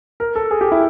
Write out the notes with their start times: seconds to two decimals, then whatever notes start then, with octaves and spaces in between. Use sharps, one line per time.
0.20 A#4
0.35 A4
0.51 G#4
0.61 G4
0.72 E4